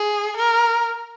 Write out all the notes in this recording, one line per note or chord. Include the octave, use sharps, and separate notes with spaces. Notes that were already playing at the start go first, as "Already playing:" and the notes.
Already playing: G#4
A#4